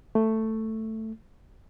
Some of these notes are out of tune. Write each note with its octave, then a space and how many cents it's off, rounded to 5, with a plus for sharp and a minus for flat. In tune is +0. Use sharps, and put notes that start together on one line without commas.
A3 +5